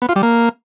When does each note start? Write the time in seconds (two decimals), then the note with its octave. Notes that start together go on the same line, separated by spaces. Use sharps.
0.02 B3
0.09 F4
0.16 G3
0.23 A#3